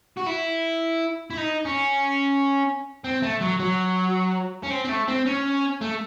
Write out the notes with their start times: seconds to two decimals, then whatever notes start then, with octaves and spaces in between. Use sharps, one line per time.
0.17 F#4
0.26 E4
1.31 E4
1.38 D#4
1.65 C#4
3.04 C4
3.22 A3
3.41 F#3
3.60 F#3
4.63 C#4
4.70 C4
4.84 C4
4.89 A3
5.08 C4
5.26 C#4
5.81 A3